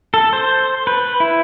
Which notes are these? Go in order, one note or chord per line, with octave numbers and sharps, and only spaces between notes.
A4
C5
B4
E4